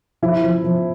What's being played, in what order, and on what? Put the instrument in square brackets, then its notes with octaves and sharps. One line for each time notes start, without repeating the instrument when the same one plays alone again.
[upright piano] F3 E4
F3
F3